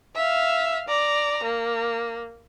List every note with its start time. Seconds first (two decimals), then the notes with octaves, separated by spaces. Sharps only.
0.15 E5 F5
0.88 D5 A#5
1.44 A#3